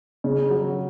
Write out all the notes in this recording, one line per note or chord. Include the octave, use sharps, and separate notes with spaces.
C#3
F#3